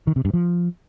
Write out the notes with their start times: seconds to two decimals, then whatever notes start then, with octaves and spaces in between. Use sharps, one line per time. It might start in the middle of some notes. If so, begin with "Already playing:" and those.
0.07 D#3
0.16 C3
0.25 G2
0.34 F3